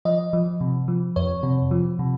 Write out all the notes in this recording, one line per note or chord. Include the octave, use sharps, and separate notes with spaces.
F3 D#5
F3
C3
F3
F2 C#5
C3
F3
C3